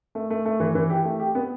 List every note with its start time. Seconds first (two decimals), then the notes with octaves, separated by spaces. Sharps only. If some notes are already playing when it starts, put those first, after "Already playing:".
0.15 A3
0.30 A3
0.45 A3
0.60 E3
0.75 E3
0.90 G4
1.05 A3
1.20 G4
1.35 B3